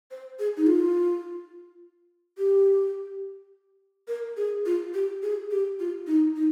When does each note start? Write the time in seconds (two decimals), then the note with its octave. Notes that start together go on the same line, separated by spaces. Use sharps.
0.11 C5
0.39 G#4
0.57 D#4
0.67 F4
2.38 G4
4.08 A#4
4.37 G#4
4.66 F4
4.94 G4
5.23 G#4
5.51 G4
5.80 F4
6.07 D#4
6.36 D#4